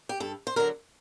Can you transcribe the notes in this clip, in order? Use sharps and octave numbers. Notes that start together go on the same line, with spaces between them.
G4
G2 A4
C5
D3 F#3 A#4